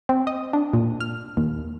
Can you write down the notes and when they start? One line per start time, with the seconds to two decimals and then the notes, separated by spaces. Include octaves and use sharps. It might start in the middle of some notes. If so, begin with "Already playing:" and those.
0.09 C4
0.27 D#5
0.53 D4
0.73 A#2
1.00 F6
1.37 D#2